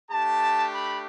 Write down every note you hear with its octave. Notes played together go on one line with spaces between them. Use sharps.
A3 D4 G4 A5
B5